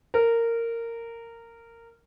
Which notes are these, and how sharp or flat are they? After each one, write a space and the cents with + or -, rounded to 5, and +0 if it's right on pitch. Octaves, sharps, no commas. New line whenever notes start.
A#4 -15